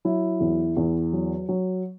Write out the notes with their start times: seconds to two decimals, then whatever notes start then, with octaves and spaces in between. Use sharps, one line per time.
0.05 F#3 E4
0.40 E2
0.77 E2
1.13 F#3
1.49 F#3